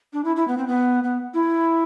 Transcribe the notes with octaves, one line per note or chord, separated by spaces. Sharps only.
D4
E4
E4
B3
C4
B3
B3
E4